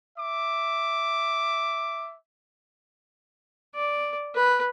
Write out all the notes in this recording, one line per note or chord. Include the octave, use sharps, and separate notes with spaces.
E5 D6
D5
B4